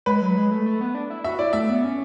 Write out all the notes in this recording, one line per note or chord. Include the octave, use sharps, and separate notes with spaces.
G#3 B4
F#3
G#3
A3
A3
B3
D4
E4
F#4 E5
E4 D5
A3 E5
B3
C#4